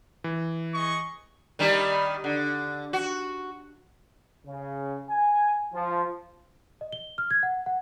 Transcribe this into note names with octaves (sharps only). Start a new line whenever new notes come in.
E3
G#4 D#5 C#6
D#3 G3 D#4
D3
F#4
C#3
G#5
F3
D#5
G7
F6
G#6
F#5
F#5